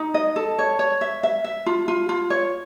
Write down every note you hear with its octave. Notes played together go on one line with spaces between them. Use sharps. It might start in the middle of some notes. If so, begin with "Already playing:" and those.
Already playing: D#4
D#5
A4
C#5
C#5
E5
E5
E5
F4
F4
F4
C#5